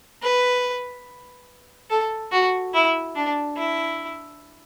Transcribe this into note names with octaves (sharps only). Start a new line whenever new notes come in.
B4
A4
F#4
E4
D4
E4